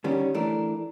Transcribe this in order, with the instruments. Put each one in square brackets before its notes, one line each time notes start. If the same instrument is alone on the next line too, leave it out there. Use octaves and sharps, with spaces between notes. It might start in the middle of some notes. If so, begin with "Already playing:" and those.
[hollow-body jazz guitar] D3 D#3 G3 C#4
E3 A3 D4 A#4